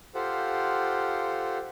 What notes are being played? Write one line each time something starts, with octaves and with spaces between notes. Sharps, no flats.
F4 G4 A4 C5 F5 F#5